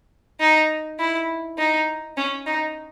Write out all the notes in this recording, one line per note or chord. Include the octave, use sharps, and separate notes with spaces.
D#4
E4
D#4
C#4
D#4